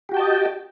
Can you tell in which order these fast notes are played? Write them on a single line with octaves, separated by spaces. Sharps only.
G4 F#4 G5 A5 D#5